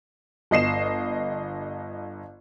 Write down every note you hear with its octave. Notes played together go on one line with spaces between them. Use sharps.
G1 D#5 C7 E7